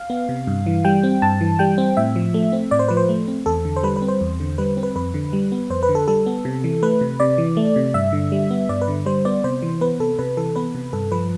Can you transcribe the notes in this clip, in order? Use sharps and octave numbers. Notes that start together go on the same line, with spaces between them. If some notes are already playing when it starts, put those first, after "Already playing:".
Already playing: F5
B3
C3
G2
E3
G3 G5
C4
G2 A5
E3
G3 G5
C4
A2 E5
F3
A3
C4
A2 D5
C5
F3 B4
C5
A3
C4
E2 A4
D3
C5
G3 B4
B4
C4
C5
E2
D3
G3 B4
C4
B4
F2 B4
D3
G3
B3
F2 C5
B4
D3
A4
G3 A4
B3
C3
E3
A3 B4
C3
C3 D5
E3
A3
C3
G2 E5
D3
G3
B3
G2 D5
B4
D3
G3 C5
B3 D5
C3 C5
E3
B3 B4
C3 A4
C3 B4
E3 A4
B3 B4
C3
G2 A4
F3 B4